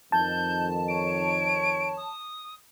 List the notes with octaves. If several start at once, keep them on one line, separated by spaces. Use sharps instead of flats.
F2 D#3 A5 G6
C#5 D7
D#6